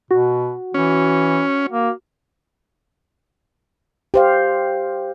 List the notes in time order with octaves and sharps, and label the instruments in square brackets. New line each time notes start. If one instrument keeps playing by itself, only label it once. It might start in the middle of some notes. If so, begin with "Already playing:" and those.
[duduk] B2 [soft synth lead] F#4
[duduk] E3 [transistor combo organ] C#4
[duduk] A#3
[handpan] G4 C5 F5